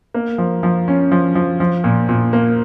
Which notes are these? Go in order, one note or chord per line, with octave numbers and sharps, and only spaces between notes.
A#3
F3
F3
C#4
F3
F3
F3
A#2
A#2
A#3